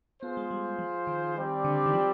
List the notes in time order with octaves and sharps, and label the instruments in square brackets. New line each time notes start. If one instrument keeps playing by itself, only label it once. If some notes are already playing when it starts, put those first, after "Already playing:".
[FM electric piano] B3 [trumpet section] F4 G#4 C5
[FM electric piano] G#3
G3
F3
D#3
[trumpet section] G3 C4 G4 D5
[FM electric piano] D3
D#3
F3